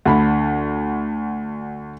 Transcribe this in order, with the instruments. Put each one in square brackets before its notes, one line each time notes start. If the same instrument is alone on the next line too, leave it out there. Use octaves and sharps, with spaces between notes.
[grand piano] D2 D3 B5